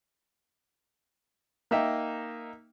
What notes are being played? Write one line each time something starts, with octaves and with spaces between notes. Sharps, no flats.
A#3 D#4 E5 G5